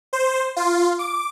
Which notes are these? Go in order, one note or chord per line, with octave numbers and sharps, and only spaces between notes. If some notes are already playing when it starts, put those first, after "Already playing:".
C5
F4
D6